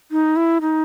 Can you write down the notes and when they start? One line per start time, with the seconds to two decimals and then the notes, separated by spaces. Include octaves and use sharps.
0.11 D#4
0.36 E4
0.61 D#4